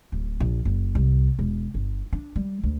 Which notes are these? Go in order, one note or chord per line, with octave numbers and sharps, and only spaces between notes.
D1
A#1
F#1
C2
E1
G1
D4
G3
D2